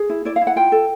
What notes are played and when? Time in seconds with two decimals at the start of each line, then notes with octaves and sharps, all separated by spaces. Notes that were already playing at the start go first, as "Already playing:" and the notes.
Already playing: G#4
0.10 E4
0.25 E4 D5
0.36 F5
0.41 E4
0.47 F#5
0.56 F4 G5
0.72 A4